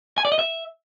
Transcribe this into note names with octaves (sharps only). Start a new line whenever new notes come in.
G#5
D5
D#5
E5